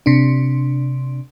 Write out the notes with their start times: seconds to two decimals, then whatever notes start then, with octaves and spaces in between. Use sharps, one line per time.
0.06 C3 D4